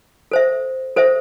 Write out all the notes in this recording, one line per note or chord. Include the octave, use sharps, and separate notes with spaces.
A4 C5 E5
A4 C5 E5